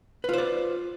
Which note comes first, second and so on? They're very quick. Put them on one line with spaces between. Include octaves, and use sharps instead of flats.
B4 F4 C5 D5